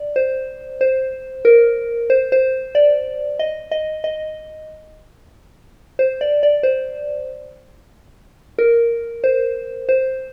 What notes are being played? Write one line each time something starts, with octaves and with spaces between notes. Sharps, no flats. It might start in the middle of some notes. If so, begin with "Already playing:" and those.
Already playing: D5
C5
C5
A#4
C5
C5
D5
D#5
D#5
D#5
C5
D5
D5
C5
A#4
C5
C5